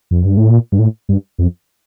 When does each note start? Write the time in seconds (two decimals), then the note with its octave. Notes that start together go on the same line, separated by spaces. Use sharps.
0.11 F2
0.24 G2
0.37 A2
0.50 A#2
0.72 G2
0.79 A2
1.09 G2
1.39 F2